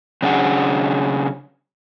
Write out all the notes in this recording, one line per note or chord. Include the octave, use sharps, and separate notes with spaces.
C#3 F#3 D4 G#4 F#5